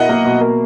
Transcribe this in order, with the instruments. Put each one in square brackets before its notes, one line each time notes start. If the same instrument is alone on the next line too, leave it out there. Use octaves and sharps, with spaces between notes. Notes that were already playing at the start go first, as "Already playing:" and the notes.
Already playing: [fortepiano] B2 E4 A#4 [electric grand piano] D#5 F#5
[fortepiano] A#3
B2
A#4